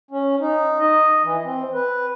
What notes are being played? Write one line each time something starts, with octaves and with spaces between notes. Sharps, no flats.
C#4
D#4
D#5
E3
C4
B4